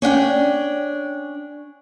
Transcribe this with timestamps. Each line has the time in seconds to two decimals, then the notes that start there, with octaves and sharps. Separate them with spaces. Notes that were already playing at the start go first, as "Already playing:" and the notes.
0.02 C#4 D4 F#5 G5